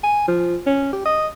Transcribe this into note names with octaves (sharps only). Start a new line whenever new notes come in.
G#5
F3
C#4
G4
D#5